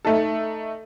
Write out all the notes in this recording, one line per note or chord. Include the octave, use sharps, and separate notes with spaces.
A3 D#4 A4